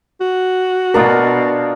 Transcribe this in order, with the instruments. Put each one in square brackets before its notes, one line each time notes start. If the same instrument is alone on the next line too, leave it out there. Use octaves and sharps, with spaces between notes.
[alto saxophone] F#4
[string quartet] B2 [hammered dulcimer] D4 F4 D#5 [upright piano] A#4